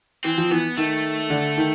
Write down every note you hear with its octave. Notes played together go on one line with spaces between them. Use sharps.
E3 C4
F3
E3 B3
D#3 A3
D3
D#3